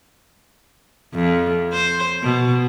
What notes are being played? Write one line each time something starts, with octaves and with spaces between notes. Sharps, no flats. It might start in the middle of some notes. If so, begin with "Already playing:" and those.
F2
C5
B2